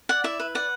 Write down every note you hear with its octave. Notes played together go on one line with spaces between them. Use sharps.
D5 F#5
E4 E5
B4
D5 F#5